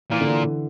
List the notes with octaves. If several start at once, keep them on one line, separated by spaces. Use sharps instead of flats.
A#2 E3
D3
E3